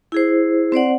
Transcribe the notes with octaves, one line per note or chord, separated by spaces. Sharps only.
E4 G#4 C5
C4 C5 D5 F#5